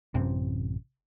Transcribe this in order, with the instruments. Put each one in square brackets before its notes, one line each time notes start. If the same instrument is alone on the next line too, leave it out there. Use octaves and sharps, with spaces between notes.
[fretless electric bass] A1 F#2 C3 C4